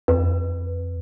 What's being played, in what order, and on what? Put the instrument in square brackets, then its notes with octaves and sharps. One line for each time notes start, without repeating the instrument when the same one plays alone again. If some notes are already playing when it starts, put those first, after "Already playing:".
[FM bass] F2 [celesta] B4